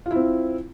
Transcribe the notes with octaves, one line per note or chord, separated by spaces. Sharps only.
C4 E4 F4